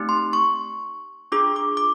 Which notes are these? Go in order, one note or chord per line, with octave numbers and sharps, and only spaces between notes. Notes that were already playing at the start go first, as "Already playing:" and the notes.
Already playing: A3 C4 D#4 G4
C6
C#6
D4 F4 G#4 D6
D6
D6